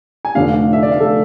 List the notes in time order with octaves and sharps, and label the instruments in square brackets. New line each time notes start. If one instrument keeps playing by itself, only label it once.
[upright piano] G#5
F1 F2 D3 A3 D4 F5
F5
E5
D5
F5
A4